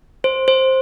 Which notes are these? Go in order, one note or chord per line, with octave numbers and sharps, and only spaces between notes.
C5
C5